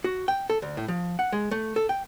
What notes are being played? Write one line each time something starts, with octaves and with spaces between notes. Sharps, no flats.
F#4
G5
A4
D2
A2
F3
F#5
G#3
A3
A4
G5